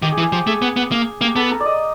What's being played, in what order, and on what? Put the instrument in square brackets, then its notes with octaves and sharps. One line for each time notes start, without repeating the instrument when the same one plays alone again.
[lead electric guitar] D#3 [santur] G4
[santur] G#4
[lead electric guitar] E3
[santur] G#4
[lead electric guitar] F3 [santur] G4
[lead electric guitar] A3 [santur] G#4
[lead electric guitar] B3
B3
A#3
[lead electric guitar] A#3 [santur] G4
[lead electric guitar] B3 [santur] A4
[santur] A#4
D5
D#5